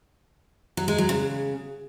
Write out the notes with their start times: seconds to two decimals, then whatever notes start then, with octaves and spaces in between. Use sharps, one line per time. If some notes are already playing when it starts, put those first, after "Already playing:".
0.77 F#3
0.88 G#3
0.98 F#3
1.09 C#3